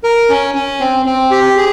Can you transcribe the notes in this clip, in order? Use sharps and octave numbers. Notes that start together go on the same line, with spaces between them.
A#4
C#4
C#4
C4
C4
G4
G#4